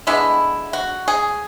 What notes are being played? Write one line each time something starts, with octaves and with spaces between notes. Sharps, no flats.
D3 G#3 B3 E4
F#4
G#4